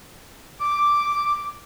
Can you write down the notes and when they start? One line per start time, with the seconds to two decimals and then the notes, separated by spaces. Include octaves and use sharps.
0.61 D6